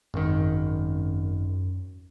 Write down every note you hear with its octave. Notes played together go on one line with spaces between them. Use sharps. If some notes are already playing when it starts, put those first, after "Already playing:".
G#1 F#2 D#3